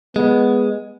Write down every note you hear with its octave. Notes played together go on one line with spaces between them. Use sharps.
G#3 B3